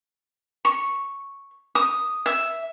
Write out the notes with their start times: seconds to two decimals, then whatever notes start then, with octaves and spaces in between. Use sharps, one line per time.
0.65 C#6
1.75 D#6
2.26 E5